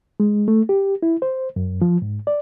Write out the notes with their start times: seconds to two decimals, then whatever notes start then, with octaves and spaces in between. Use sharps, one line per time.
0.20 G#3
0.48 A3
0.69 G4
1.03 E4
1.22 C5
1.56 F#2
1.82 F3
2.02 G#2
2.27 D5